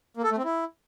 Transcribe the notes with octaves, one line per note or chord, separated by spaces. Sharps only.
A#3
A4
A3
C4
E4